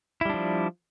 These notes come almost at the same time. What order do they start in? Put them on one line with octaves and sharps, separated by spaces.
E4 G3 D4 F3